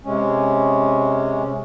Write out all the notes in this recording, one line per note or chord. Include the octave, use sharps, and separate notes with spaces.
C3 G#3 C#4